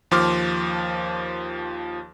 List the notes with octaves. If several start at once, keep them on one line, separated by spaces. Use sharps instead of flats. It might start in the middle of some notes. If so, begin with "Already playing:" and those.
D#2 F3 C6 D6 F6